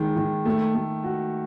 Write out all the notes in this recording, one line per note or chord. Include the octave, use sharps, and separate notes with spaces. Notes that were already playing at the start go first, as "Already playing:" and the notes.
Already playing: D#3 G#3
D#3
A3
A3
F#4